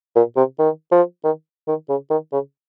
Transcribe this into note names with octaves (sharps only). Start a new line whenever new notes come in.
A#2
C3
D#3
F3
D#3
D#3
C#3
D#3
C#3